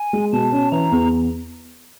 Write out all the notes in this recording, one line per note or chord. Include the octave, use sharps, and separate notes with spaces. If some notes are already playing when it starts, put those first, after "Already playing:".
Already playing: G#5
G#3
B2 A5
C#4
E3 A#5
E2